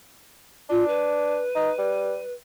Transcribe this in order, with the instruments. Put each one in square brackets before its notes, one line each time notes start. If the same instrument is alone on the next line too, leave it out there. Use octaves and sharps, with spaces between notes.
[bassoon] D4 [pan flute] F4
[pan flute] B4
[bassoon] D#4
G3